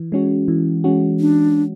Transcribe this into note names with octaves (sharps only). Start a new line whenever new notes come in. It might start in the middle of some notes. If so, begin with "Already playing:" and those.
Already playing: E3
G#3 C#4 F#4
E3
G#3 C#4 F#4
D4